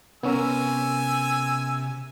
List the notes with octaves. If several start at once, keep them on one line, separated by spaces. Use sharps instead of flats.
C3 B3 C#4 A#4 G#5 E6